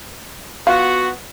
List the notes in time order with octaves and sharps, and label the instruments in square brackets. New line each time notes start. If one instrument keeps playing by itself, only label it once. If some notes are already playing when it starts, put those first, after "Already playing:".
[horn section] B3 F#4 [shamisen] F4